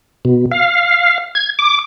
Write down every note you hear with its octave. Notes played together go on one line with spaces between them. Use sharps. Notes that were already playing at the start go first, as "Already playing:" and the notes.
B2
F5
G#6
D6